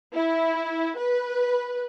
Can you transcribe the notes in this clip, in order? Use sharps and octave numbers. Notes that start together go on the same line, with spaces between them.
E4
B4